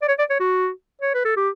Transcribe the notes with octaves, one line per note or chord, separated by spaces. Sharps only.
D5
C#5
D5
C#5
F#4
C#5
B4
A4
G4